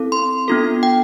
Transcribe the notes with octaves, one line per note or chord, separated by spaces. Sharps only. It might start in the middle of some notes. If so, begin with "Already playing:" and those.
Already playing: C4 E4 A4
C6
B3 D4 F4 A4
G5